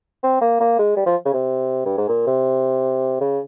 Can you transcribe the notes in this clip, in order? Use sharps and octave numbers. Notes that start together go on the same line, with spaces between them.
C4
A#3
A#3
G#3
G3
F3
C#3
C3
G2
G#2
A#2
C3
C#3